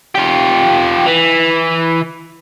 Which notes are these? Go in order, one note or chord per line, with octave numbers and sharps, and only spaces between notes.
F4 G4
E3